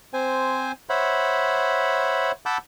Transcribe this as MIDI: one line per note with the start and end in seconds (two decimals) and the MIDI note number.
0.14 0.72 60
0.14 0.72 72
0.14 0.72 80
0.89 2.32 72
0.89 2.32 73
0.89 2.32 76
0.89 2.32 78
0.89 2.32 83
2.46 2.58 78
2.46 2.58 81
2.46 2.58 83
2.46 2.58 86
2.46 2.58 88
2.46 2.58 91